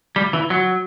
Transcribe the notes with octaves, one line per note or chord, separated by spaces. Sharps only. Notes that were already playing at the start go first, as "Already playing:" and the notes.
G3
E3
F#3